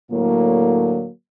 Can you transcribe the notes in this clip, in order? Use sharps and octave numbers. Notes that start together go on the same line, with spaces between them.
A2 D3 F#3 A#3